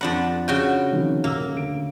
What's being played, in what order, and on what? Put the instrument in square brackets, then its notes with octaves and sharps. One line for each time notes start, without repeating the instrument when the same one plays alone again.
[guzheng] F2 D4 F#5 [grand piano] B5
[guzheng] C#3 F#4 G5
[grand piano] C3 D#3 F3
[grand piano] D#1 E6 [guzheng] A#3
[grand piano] D2 D7